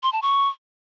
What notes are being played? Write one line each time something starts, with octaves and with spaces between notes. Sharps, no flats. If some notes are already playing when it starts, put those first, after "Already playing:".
C6
A5
C#6